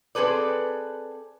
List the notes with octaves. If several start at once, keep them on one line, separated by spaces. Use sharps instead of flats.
C4 G#4 A4 B4 D5